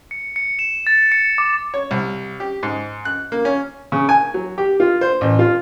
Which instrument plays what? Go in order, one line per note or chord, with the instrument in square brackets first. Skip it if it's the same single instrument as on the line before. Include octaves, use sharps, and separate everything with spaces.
[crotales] C#7
C#7
E7
A6
C#7
D6
[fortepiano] C#5
C2
G4
G#2
F#6
A#3
C#4
C#3
G#5
F#3
G4
F4
C5
A1
F4